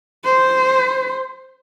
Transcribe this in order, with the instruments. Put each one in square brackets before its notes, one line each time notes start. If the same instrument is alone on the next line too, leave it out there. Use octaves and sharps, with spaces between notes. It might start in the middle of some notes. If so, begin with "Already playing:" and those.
[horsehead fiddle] C5